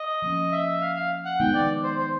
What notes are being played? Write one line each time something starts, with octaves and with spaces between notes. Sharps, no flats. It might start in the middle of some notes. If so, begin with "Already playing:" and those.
Already playing: D#5
F3 A#3 C#4
E5
F5
F5
F#5
D#3 G#3 B3 D#4 G5
D5
C5
C5